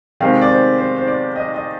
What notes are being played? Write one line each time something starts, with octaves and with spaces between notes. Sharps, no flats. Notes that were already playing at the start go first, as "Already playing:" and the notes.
C3 D#3 G#3 C4 F5
D5
C5
C5
C5
D5
D#5
D#5